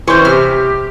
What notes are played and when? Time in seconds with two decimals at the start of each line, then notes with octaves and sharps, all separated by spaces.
0.08 E3 C#4 C5 C#5 G5
0.25 C3 G4 F6